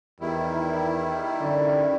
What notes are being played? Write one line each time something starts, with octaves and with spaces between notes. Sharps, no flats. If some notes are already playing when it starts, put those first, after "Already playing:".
E2 D#3 G3 E4
F#2 D3 D5